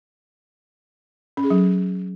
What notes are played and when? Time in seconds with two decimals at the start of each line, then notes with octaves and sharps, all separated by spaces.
1.37 C#4
1.44 G#4
1.50 F#3